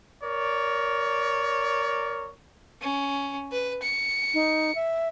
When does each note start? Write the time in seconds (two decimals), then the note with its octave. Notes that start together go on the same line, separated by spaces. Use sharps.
0.23 A#4 C#5 D5
2.81 C#4
3.52 B4
3.83 C#7
4.34 D#4
4.75 E5